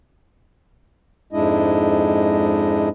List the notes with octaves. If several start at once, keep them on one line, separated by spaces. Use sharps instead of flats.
F2 G#2 G#3 D4 E4 D#5